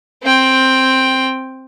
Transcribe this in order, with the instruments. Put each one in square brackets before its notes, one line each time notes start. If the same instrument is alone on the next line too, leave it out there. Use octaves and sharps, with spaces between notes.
[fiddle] C4 G5